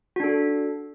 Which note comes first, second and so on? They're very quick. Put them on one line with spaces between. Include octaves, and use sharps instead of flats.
F#4 D4 A4